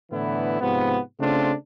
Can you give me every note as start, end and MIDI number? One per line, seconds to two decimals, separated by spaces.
0.11 0.57 45
0.11 0.57 50
0.11 0.57 52
0.11 0.57 59
0.11 0.57 64
0.60 0.98 44
0.60 0.98 48
0.60 0.98 53
0.60 0.98 59
1.19 1.52 49
1.19 1.52 57
1.19 1.52 60
1.19 1.52 62
1.19 1.52 65